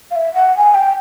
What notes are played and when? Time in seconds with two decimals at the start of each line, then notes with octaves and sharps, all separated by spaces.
0.11 F5
0.16 E5
0.34 F#5
0.57 G#5
0.74 G5